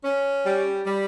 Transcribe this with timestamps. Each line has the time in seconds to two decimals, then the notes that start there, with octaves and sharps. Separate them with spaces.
0.04 C#4
0.45 G3
0.87 G3